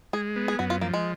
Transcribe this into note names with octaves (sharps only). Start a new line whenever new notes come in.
G#3 G#4
B3
G#4
F#2 F#4
F4
F3 A#3
G#3